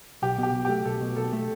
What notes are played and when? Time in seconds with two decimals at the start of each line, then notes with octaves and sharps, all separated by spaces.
0.22 B1 G4
0.38 B2
0.43 G4
0.54 B1
0.65 A3 G4
0.85 B1 A4
1.01 B2
1.16 B1 A4
1.33 A3